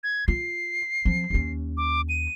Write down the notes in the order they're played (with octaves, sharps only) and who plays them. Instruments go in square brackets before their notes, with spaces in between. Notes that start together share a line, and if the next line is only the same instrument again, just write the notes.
[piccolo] G#6
[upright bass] F4 [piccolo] C7
[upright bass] F3 C4
D#2 C#4
[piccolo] D6
D#7